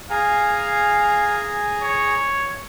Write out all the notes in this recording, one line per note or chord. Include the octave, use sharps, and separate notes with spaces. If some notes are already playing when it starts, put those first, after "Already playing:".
G#4 F5 G#5 A#5
C#5